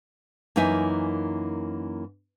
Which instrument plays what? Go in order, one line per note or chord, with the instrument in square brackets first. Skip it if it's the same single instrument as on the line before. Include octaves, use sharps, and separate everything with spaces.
[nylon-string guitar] F#2 E3 A#3 D#4 E5 G#5